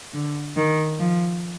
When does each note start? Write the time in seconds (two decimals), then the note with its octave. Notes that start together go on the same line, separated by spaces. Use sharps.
0.14 D3
0.57 D#3
1.00 F3